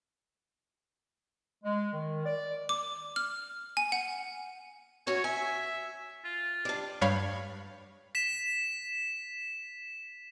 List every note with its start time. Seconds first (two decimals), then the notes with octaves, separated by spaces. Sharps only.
1.64 G#3
1.93 D#3
2.26 D5
2.69 D6
3.16 F6
3.77 G#5
3.92 F#5
5.07 C#4 E4 F#4 C#5
5.24 E5 G#5
6.25 F4
6.65 G3 D4
7.01 G2 G3 C#5 F5 B5 F6
8.15 B6 E7